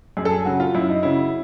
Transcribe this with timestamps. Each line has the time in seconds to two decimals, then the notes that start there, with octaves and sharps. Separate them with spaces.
0.17 F#2 G#4
0.25 A4
0.31 G#4
0.45 C#3 F#3 F#4
0.60 F4
0.75 F#2 E4
0.89 D#4
1.03 C#3 F#3 E4